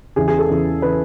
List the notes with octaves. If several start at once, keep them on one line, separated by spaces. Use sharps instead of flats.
E2 C#3 E3 G#4
G#4
A4
E2 C#3 E3
C#3 E3 B4